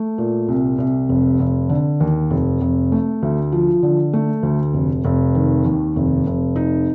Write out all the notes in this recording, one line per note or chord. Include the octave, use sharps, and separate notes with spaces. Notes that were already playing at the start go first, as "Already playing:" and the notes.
Already playing: A3
A#2
C2
C2
F1
F1
D3
D#2
F1
F1
A3
D2
F3
D3
A3
D2
F1
F1
D#3
D#2
F1
F1
D#4